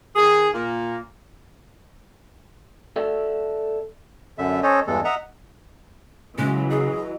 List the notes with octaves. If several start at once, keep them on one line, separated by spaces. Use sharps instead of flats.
D#3 G#4
A#2 A#3
A4 D5 E5
F#2 D3 E5
C#4 A4 C5 C#5 D#5
E2 G2 E3 G#3 A4
D#5 E5 F#5 A#5
C#3 E3 F#3 G#3
G#4 D#5